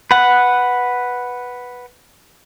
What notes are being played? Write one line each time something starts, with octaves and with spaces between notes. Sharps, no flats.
B4 F#5